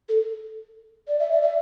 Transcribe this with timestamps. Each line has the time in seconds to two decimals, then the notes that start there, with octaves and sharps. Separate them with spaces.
0.09 A4
1.08 D5
1.20 E5
1.31 D5
1.42 E5